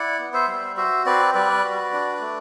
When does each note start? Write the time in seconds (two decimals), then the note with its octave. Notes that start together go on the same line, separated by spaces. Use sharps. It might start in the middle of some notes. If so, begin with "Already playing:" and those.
Already playing: E4 D5 F#5
0.19 B3
0.33 C5 E5
0.48 G3
0.77 F#4 C5 E5
1.06 C4 B4 D5
1.34 G3 B4 D5
1.63 F#4
1.92 D4
2.21 A3